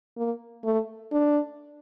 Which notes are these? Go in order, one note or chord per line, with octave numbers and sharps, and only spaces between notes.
A#3
A3
D4